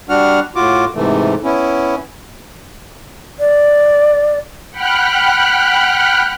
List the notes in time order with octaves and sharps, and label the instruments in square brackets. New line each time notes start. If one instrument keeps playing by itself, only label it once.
[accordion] G3 D4 F#4 F#5 F6
A2 F4 F#4 D6
G#2 C3 E3 A3
B3 C#4 E4
[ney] D5
[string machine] F#5 G5 B5 F6 F#6